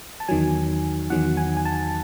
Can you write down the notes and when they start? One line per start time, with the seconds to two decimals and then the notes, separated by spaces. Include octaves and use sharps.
0.20 A5
0.28 E2 D#3 F#3 G#5
1.10 E2 D#3 F#3 F#5
1.37 G#5
1.57 G#5
1.65 A5